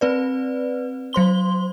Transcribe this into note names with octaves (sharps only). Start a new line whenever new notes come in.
C4 B4 D5
F#3 C5 C6 G7